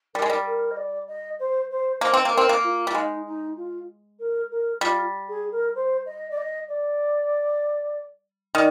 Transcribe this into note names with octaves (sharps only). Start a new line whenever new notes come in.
G3 A#4
G#3
G3
A#4
D#5
D5
D#5
C5
C5
A#3 C5
C4
A#3
C4 A#4
A#3
F4
G3
G#3 D#4
D#4
F4
A#4
A#4
G3 F4
G#4
A#4
C5
D#5
D5
D#5
D5
D#3 D5